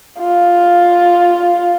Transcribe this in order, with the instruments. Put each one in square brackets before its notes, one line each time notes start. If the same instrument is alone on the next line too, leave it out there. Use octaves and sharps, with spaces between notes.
[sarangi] F4